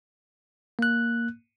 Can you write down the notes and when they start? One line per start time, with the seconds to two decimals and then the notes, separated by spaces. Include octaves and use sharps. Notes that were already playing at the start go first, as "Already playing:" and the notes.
0.79 A#3 F#6